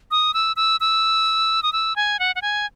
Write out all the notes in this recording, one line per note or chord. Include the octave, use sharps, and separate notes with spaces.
D#6
E6
E6
E6
D#6
E6
G#5
F#5
F#5
G#5